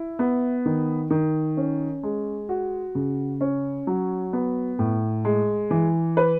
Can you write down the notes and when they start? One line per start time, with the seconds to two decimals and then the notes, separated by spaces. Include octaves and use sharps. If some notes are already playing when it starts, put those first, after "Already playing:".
Already playing: E4
0.19 B3
0.66 D#3
1.10 D#3
1.57 C#4
2.03 G#3
2.49 F#4
2.95 C#3
3.41 C#4
3.87 F#3
4.33 B3
4.79 A2
5.25 G#3
5.71 E3
6.17 B4